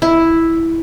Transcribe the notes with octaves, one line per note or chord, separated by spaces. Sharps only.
E4